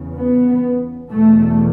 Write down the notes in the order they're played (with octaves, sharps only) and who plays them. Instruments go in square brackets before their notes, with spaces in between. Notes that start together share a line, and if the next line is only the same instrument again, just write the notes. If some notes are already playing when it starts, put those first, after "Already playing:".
Already playing: [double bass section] E2 C#3
B3
E2 B2 A3